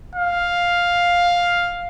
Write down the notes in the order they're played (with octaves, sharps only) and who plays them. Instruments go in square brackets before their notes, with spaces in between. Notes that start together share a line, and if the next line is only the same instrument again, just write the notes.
[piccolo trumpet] F5